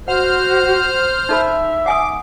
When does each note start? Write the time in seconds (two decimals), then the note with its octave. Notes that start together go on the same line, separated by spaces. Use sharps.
0.08 F#4 C5 F#5 F6
1.29 D#4 A4 E5 B5
1.86 F#5 G#5 D6 D#6